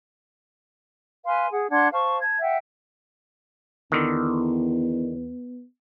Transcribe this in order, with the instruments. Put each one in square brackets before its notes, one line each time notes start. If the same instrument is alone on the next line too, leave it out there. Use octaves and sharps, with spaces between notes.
[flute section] B4 F5 G#5 C6
G#4 F#5
D4 F#5 C6 G#6
C5 F5 A5 C#6
A5 G#6
E5 F#5 G5
[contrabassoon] E2 [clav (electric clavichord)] D3 D#3 [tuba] B3